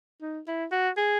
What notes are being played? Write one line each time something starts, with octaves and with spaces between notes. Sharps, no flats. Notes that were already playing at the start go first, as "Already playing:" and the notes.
D#4
E4
F#4
G#4